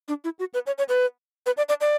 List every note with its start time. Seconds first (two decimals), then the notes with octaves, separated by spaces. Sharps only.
0.08 D4
0.24 E4
0.39 F#4
0.54 B4
0.67 C#5
0.78 C#5
0.89 B4
1.46 B4
1.57 D5
1.69 D5
1.81 D5